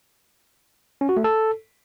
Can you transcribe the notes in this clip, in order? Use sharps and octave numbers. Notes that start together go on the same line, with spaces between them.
C#4
F#4
A3
A4